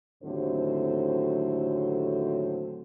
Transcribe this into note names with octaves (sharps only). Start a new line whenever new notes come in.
D#2 A2 D3 F#3 C4 C5